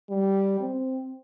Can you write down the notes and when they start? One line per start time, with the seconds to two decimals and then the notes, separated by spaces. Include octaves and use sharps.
0.10 G3
0.60 C4